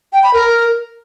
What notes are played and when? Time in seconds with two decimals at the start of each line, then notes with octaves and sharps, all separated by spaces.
0.13 G5
0.23 B5
0.34 A#4